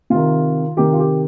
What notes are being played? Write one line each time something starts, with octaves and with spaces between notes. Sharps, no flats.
C3 D#3 F4
C3 D#3 G4
F4
G4